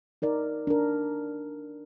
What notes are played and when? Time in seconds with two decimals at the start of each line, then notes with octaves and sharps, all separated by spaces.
0.22 D#4 A#4 D5
0.67 D4 A#4